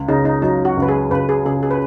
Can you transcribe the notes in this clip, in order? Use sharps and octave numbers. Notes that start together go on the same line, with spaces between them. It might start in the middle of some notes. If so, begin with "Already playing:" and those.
Already playing: C#2
C#3 D#4
D#4
F#3 D#4
F#4
C#2
B4
G#4
C#2 B4
G#4
C#3 G#4
G#4
B4